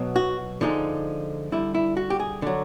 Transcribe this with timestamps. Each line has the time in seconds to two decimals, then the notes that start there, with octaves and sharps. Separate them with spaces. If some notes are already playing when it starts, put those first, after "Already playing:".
Already playing: B2 F#3
0.16 F#4
0.61 D3 F3 G#3 D#4
1.52 D3 G3 E4
1.75 E4
1.97 F#4
2.10 G4
2.20 G#4
2.42 D3 F#3